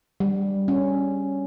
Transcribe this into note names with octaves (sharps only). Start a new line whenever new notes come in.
G3
C#4